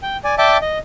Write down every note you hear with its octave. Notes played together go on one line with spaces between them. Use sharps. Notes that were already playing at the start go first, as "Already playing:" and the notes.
G5
D5 G#5
D5 E5 G5 A5 D6
D#5